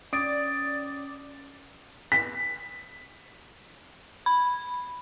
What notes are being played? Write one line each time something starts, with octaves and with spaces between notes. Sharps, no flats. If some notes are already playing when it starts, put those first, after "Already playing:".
C#4 D5 D#6 A6 D7
B6
B5